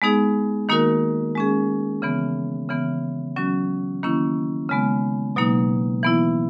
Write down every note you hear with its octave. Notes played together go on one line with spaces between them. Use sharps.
G#3 B3 D#4 G#4
D#3 A#3 D#4 F#4 A#4
G#3 C#4 G#4
C#3 E3 B3
C#3 E3 B3
F#3 C#4 F#4
D#3 A#3 C#4 E4
C#3 G#3 B3
B2 F#3 A#3 D#4
E3 B3 E4